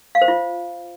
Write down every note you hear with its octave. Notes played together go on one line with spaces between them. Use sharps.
F5
C5
F4